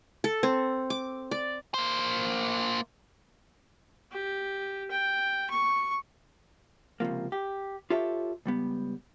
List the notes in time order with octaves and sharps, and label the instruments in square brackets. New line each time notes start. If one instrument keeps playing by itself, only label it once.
[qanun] A4
C4
D6
D5
[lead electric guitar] A#3 C5
[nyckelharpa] G4
G5
C#6
[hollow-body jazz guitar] C#2 C3 F3 A#3
G4
F4 G4 A4 C#5 E5
C#2 G3 B3